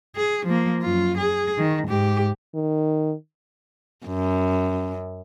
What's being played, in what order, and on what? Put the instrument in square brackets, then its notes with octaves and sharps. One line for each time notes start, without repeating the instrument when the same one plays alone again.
[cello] G#4
F3 A#3
F#2 F4
G#4
D#3
G#2 G4
[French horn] D#3
[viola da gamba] F#2